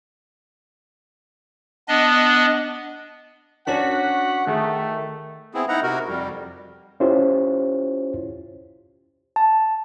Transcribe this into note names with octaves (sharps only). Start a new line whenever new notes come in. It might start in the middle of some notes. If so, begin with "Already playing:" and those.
B3 D4 D#5
C#4 D4 F#4 A#4 F#5 B6
D#3 A3 G#4
B3 C4 E4 G#4
D#4 E4 F#5 A#5
C3 F#4 A#4
F2 G3
C#4 E4 F4 G4 C5 C#5
A5